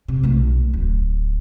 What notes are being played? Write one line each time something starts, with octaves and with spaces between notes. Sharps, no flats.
C3
B1 A3
D1